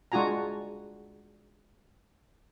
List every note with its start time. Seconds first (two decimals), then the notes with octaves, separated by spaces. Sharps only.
0.12 G#3 D4 F4 F#4 G#5 A#5